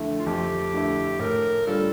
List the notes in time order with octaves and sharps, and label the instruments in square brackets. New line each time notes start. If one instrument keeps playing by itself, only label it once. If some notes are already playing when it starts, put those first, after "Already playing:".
Already playing: [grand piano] F2 D3 A3 E4
[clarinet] F4
[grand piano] F2 [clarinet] G4
[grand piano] D3 A3 E4
[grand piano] A2 [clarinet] A#4
[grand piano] G3 D4 F4 [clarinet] A4